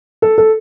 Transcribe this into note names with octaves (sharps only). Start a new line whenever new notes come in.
A4
A4